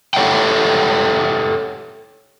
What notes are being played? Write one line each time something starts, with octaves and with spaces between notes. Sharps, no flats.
G4 A4 C#5 E5 F#5 G5